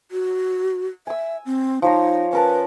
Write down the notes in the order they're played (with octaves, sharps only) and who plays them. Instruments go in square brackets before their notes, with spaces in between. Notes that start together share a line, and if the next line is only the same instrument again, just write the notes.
[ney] F#4
[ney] E5 [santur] G#5 E6
[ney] C4
[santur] F3 C#5 A#5 [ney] D#4
[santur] C#4 A#4 A5 [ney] B4